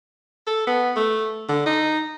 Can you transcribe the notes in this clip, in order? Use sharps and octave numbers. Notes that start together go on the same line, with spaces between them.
A4
B3
A3
D3
D#4